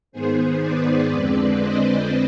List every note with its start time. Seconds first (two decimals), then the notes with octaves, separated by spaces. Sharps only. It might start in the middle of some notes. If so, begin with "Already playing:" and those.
0.12 G#2 D#3 B3 G#4 C5
0.61 B4 D5
1.10 F2 D3 G#3 C4
1.58 C5 D#5